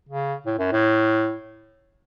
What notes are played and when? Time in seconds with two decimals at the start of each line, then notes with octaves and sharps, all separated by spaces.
0.09 C#3
0.46 A2
0.59 F#2
0.72 A2